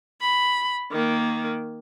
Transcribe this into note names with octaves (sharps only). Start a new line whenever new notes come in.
B5
D#3 A#3